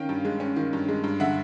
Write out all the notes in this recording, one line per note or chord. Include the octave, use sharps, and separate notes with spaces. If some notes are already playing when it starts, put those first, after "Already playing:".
Already playing: D#3 C#4 F5 G5
G2
G#3
C#4
D#3
G2
G#3
G2
D3 E5 F#5